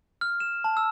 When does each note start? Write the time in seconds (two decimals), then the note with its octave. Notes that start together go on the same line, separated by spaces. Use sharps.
0.21 F6
0.40 E7
0.64 A5
0.77 E6